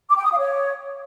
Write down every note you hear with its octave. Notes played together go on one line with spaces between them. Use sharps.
D6
G5
D#6
F5
C#5